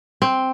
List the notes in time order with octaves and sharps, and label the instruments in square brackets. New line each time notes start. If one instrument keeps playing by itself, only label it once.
[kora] C4